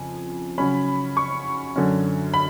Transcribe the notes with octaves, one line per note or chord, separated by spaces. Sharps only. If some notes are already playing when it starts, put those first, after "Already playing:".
Already playing: F2 C#3 F3 G#5
C#3 F#3 C#4 B5
C#6
F#2 D3 F#3 C#4
B5